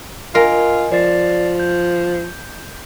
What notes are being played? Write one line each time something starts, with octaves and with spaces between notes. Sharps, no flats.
F4 A#4 D#5 G#5
F3 D5 A6 C7
G6